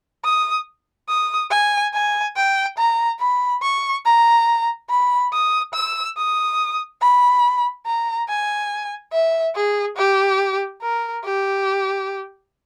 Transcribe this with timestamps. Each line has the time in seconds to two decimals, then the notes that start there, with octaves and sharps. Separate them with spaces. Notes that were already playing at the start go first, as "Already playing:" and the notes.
0.24 D#6
1.08 D#6
1.51 G#5
1.93 G#5
2.36 G5
2.78 A#5
3.20 B5
3.62 C#6
4.05 A#5
4.90 B5
5.32 D#6
5.74 E6
6.17 D#6
7.01 B5
7.86 A#5
8.29 G#5
9.13 E5
9.55 G#4
9.97 G4
10.82 A#4
11.24 G4